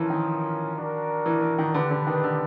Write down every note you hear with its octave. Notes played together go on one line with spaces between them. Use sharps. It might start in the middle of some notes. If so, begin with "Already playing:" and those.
Already playing: E3 F3 C#4 F4 A#4
D#3
D4 F#4 A#4 D5
E3
E3
D#3
D3 D4 G4 B4
D3
D#3
D3